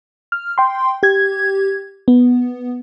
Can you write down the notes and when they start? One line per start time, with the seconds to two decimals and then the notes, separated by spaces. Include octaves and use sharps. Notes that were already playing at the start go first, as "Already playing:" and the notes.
0.32 F6
0.58 G5 C6
1.03 G4 G#6
2.08 B3